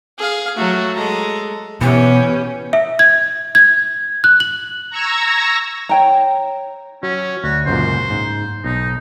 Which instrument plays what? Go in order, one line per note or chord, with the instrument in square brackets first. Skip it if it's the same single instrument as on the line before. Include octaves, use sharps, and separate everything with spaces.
[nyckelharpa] G#4 F5
[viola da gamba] F#3 A3 [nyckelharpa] F#4
[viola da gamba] G#3 [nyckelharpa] A4 A#5
[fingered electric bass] B2 [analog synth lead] E3 [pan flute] B3 [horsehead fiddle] C#4 G4
[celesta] E5
G#6
G#6
F#6
F#7
[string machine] A#5 C#6 E6 G#6 A#6
[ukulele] C#5 G5 A#5
[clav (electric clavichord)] F#3 [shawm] C#4
[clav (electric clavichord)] D2 [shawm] F#4
[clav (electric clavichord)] C#2 F#2 A#2 [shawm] C5
[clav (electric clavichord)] G#2
[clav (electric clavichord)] B1 [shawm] D#4